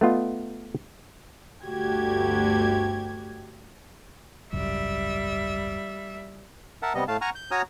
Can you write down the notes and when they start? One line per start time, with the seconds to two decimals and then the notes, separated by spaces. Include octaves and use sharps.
0.01 A3 B3 F4 D#5
1.64 G1 D2 A3 F#4 G4 G#6
4.53 G#1 C#2 F#2 G3 E5
6.82 A#4 E5 F#5 A5
6.95 C3 G3 B3 D#5
7.08 A2 A3 F5 A5
7.21 F#5 G#5 A#5 C#6 F6
7.35 G6
7.51 F#4 C#5 G#5 A#5 D#6 F6